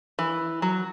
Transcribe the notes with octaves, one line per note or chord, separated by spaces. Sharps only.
E3
F#3